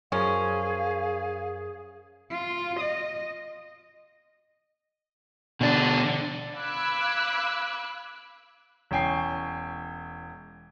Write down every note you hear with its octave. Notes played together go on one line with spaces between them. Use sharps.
F#2 F3 C#4 G#4 A#4 F5
F4
D#5
B2 D3 D4
F5 B5 D6 E6 F#6 G#6
E1 C#4 G5 G#5 C7